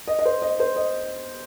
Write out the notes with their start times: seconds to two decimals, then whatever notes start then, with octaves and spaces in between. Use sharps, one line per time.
0.08 D#5
0.19 D#5
0.26 C5
0.42 D#5
0.60 C5
0.76 D#5